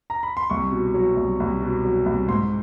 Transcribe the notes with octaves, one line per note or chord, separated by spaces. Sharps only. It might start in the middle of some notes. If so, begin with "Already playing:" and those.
A#5
B5
C6
C2 C#6
B2
F#3
C2
C2
B2
F#3
C2
G#2 C6